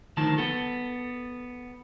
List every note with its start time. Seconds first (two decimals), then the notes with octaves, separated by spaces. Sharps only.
0.17 D2 D#3 F3 A5
0.38 B3 A4